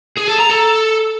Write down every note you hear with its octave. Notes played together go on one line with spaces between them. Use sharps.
G#4
A4
A#5
A4